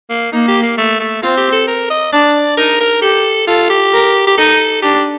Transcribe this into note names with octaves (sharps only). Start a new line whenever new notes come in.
A#3
A#3 D#4
G4
A#3
A3
A3
C4 F4
G4
A4
A#4
D#5
D4 D5
D#4 A#4
A#4
G4 A4
F4 A4
G4
A#4
G4
D#4 A4
D4 G4